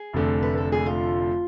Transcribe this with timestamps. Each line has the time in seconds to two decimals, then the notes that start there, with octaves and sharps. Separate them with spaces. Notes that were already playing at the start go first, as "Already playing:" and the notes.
Already playing: G#4
0.13 F1 F2 D3 A3
0.42 B4
0.58 A4
0.72 G#4
0.86 F4